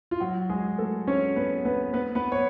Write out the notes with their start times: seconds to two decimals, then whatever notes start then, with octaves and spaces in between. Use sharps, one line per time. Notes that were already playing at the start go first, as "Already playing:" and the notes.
0.11 F4
0.20 F#3 F#4
0.50 G#3 G#4
0.78 A3 A4
1.07 C#4 C#5
1.36 B3 B4
1.65 B3 B4
1.94 B3 B4
2.15 B3 B4
2.32 C#5